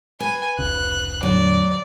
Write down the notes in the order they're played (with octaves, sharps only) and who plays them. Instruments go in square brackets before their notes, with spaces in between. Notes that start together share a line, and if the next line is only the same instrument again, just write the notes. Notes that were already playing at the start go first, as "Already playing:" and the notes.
[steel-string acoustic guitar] B4 [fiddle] G#5
[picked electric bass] F1 C#2 C#3 [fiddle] F#6
[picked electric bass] E2 A2 D3 [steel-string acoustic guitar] F#3 [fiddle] D5